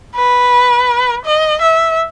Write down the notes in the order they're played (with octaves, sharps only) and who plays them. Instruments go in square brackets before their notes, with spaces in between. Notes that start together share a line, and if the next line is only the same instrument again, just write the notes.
[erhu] B4
D#5
E5